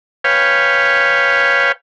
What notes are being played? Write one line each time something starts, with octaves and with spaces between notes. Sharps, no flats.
B4 C#5 F5 G5 G#5